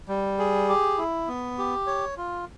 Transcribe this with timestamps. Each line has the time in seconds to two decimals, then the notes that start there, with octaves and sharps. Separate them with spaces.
0.08 G3
0.39 G#4
0.69 G4
0.98 E4
1.28 B3
1.58 G4
1.87 C#5
2.17 F4